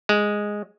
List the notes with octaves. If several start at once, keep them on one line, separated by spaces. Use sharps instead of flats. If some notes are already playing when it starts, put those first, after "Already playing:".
G#3